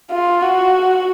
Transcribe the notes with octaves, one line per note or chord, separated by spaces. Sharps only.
F4
F#4